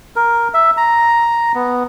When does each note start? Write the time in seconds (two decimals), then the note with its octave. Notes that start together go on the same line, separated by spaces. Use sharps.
0.16 A#4
0.54 E5
0.77 A#5
1.55 B3